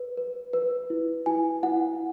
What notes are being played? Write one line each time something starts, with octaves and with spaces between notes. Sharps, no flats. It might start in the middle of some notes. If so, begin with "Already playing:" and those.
Already playing: B4
B4
B4
E4
E4 G#5
E4 F#5